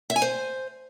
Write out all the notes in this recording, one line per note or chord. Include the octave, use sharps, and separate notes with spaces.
E5
G#5
C5